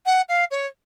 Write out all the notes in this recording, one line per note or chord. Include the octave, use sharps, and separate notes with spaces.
F#5
F5
C#5